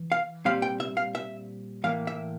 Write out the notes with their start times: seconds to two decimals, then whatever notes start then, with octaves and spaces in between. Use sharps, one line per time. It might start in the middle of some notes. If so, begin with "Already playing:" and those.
Already playing: E3
0.12 F5
0.45 A#2 G3 C4 F5
0.62 G5
0.80 E5
0.97 F5
1.15 E5
1.84 A2 E3 A#3 F5
2.07 E5